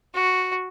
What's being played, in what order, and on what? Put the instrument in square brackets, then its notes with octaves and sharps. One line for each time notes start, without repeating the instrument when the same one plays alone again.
[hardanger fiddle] F#4